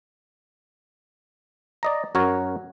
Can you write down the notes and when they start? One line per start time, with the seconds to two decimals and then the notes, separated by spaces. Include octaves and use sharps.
1.83 D5 D#5 A#5
2.15 F#2 F#4 A#4 C#5